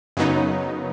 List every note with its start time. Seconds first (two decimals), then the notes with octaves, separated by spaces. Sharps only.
0.17 F#2 C#3 F#3 B3 D#4